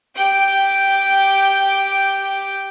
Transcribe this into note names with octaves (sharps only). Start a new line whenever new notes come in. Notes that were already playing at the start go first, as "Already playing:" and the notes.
G4 G5